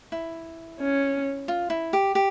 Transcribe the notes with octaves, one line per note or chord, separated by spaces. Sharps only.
E4
C#4
F4
E4
G4
G4